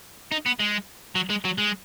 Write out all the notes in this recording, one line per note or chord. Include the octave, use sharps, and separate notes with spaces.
D#4
B3
G#3
F#3
G#3
F#3
G#3